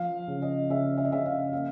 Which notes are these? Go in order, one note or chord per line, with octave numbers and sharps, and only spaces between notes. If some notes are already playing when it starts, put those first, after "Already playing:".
Already playing: F3 F5
C#3
D#5
C#3 E5
E5
D#5
C#3 E5
F5
A#3 F5